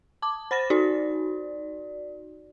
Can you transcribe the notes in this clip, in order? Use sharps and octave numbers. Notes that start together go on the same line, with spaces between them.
A5 D6
C5 B5 A6 A#6
D#4 F#4 D5